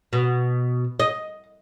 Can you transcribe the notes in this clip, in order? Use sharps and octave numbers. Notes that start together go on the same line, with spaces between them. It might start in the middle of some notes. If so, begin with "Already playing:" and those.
B2
D#5